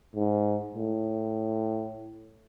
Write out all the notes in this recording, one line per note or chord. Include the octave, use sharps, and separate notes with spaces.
G#2
A2